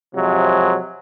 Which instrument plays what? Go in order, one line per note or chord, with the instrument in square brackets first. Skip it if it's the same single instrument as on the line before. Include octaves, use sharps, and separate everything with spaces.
[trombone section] C3 F3 F#3 G#3